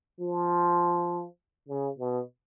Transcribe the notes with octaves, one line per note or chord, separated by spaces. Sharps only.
F3
C#3
B2